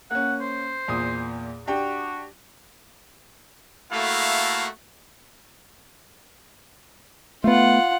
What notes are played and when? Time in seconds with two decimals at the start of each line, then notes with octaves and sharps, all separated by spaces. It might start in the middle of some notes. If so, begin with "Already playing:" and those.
0.11 A#3 C#4 F#5
0.41 C5
0.88 E2 A#2 D#6
1.67 D4 F#4 G4 G5
3.92 A3 A#3 E4 F#4 A4 F5
7.44 A3 B3 F4 F#5